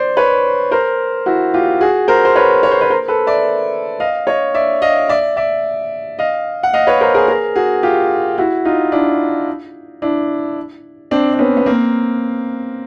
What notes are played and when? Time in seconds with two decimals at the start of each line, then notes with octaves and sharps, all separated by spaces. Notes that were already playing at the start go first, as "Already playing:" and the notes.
Already playing: C5 D5
0.17 B4 C#5
0.71 A#4 C5
1.26 E4 F#4
1.54 F4 G4
1.81 F#4 G#4
2.08 A#4 C5
2.25 C5
2.36 B4 C#5
2.63 C#5
2.71 C5
2.81 B4 C#5
2.90 A#4 C5
3.08 A4 B4
3.27 D5 E5
4.00 D#5 F5
4.27 C#5 D#5
4.54 D5 E5
4.82 D#5 F5
5.09 D5 E5
5.37 D5 E5
6.19 D#5 F5
6.63 F#5
6.73 D#5 F5
6.87 B4 C#5
7.01 A#4 C5
7.15 G#4 A#4
7.28 G#4 A#4
7.56 F#4 G#4
7.83 F4 G4
8.38 E4 F#4
8.65 D#4 F4
8.92 D4 E4
10.02 D4 E4
11.11 C4 D4
11.34 D4
11.39 B3 C#4
11.57 B3
11.66 A#3 C4